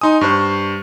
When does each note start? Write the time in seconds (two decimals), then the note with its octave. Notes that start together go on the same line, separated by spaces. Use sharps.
0.01 D#4 G#5 C6 D#6
0.21 G2 C5 C#6 F#6